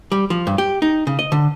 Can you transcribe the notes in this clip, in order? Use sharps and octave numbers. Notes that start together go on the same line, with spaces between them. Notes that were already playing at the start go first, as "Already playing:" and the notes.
G3
F3
G2
G4
D#4
C#3
D#5
D3